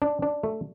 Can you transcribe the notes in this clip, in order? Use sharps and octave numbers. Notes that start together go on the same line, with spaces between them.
D4
D4
A3